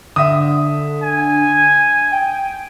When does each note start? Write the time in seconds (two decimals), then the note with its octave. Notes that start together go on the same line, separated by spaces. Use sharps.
0.16 D3 E5 D#6
1.03 G#5
2.12 G5